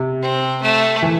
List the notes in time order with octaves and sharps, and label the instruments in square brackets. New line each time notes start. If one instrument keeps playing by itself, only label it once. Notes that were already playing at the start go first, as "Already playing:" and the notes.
Already playing: [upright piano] C3
[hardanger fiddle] C4
A3
[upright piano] E3